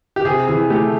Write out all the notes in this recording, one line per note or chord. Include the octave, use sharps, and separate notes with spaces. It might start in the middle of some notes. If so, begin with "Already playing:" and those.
G4
C3 G#4
E3 G#4
A3 G4